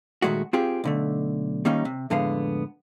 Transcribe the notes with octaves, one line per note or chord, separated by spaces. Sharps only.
A#2 D#3 G#3 A3 F#4
C4 F4 G4 G#4
B1 D3 A3
D#3 G3 A#3 C#4 D#4
C3
F2 A2 D3 G#3 B3 F5